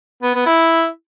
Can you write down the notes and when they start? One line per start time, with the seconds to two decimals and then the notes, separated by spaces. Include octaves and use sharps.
0.23 B3
0.34 B3
0.46 E4